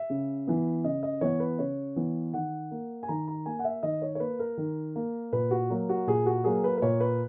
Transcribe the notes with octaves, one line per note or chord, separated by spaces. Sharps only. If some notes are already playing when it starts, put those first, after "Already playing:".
Already playing: E5
C#3
E3 B3
C#3 D#5
D#5
E3 B3 C#5
B4
C#3 C#5
E3 B3
D#3 F#5
A#3
G#5
D#3 A#5
A#5
A#3 G#5
F#5
E5
D#3 D#5
C#5
C#5
A#3 B4
A#4
D#3
A#3
A#2 B4
F#4
F#3 A#3
F#4
A#2 G#4
F#4
F#3 A#3 G#4
B4
B4
A#2 C#5
B4